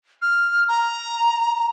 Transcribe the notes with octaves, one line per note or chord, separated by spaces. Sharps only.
F6
A#5